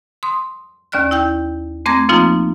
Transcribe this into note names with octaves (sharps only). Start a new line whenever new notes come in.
C6 D#6
D#2 C#4 D5 F6 F#6
E4 G5 G6
A3 C4 A#5 D6 G#6 A#6
F3 A#3 C4 D#4 F4